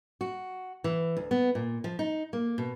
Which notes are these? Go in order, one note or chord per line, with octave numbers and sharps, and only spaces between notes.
F#4
E3
D2
B3
A#2
F3
D#4
A#3
B2